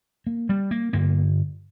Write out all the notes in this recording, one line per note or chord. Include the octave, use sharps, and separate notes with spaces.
A#3
G3
A#3
G2 D3 A#3